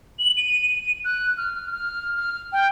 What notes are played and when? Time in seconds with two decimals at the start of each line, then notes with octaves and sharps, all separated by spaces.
0.19 F#7
0.37 D#7
1.05 F#6
1.37 F6
1.72 F6
2.17 F6
2.53 G5